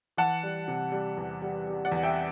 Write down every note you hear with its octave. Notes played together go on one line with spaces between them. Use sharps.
E3 F#5 A5
G3
C3
G3
E2
G3
G3
D5 F#5
E2
E5 G5